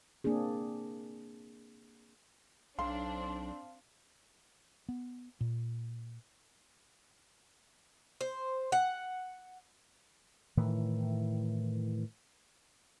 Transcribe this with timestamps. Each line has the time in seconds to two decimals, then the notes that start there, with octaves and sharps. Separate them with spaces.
0.24 A#3 C4 D4 G#4
2.79 B1 C4 D4 F5 C6
4.89 B3
5.41 A#2
8.21 C5
8.72 F#5
10.57 A2 D#3 E3